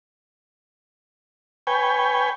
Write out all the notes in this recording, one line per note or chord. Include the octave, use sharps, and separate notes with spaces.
B4 C#5 G5 G#5